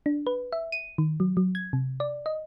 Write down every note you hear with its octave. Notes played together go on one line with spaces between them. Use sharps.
D4
B4
E5
D#7
D#3
F#3
F#3
G#6
C3
D5
D#5